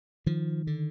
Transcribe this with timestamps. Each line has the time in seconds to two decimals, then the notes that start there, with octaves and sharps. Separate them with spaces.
0.26 D#3 F3
0.67 D3